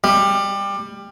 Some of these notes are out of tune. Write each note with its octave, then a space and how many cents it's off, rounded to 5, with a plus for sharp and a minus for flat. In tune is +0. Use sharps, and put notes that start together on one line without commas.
G3 +20